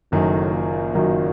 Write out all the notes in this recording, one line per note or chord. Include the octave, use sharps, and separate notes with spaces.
F#1 F#2 A2 D#3 F#3
A#2
F#1 F#2 D#3 F#3